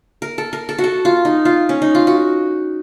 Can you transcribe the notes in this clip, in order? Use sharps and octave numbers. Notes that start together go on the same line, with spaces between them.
A#4
A4
A#4
A4
F#4
A4
F4
D#4
F4
C#4
D#4
F4
F#4